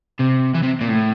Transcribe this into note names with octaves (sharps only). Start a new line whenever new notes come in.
C3
E3
C3
A#2
A2